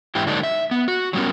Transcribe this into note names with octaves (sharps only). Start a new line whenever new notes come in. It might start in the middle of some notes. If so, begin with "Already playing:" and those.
G#2 E3 E4 G4
D3 F#3 G#3 A#3 D4 D#4
E5
B3
F#4
F#3 G3 B3 C#4 A#4